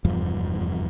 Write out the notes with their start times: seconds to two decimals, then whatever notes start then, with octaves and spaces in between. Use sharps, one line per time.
0.05 F1 E2 G2 F3